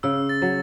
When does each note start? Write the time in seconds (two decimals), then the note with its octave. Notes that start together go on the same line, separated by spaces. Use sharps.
0.03 C#3 E6
0.29 A6
0.42 F#3